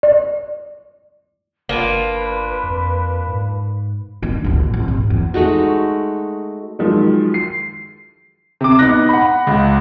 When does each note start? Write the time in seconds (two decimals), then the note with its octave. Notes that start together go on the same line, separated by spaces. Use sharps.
0.03 D5
1.69 G1 A#3 D4 F4 B4
2.63 F2
3.27 G#2
4.22 D#3 D4
4.44 A1 D2
4.74 C2
4.88 G#2
5.10 E2
5.34 G#3 A3 D#4 F#4
6.79 D#3 F3 F#3 G#3
7.34 C7
8.61 C3 D6
8.79 B3 D#4 F#6 A#6
9.09 F#5 B5
9.47 C#2